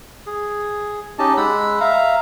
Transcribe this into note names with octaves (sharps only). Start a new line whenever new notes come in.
G#4
C#4 D#4 G4 D#5 A5
G#3 F#5 B5 E6
E5 F5 A#5